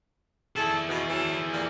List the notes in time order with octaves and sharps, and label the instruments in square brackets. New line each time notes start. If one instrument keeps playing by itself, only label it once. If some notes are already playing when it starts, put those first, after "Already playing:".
[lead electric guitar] E4 G#4 [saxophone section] A4
[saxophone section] B2
E3 F#3 A4
A#2 G3 A#3